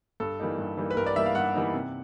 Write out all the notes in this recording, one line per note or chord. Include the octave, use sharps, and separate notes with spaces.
G2 A4
E3 G3 A#3 D#4
G2
E3 G3 A#3 D#4
B4
G2 A#4
D5
E3 G3 A#3 D#4 E5
F5
G2 F#5
E3 G3 A#3 D#4
C3